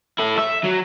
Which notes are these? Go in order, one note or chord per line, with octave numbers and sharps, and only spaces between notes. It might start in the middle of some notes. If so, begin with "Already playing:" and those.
E4 A4
E5
F#3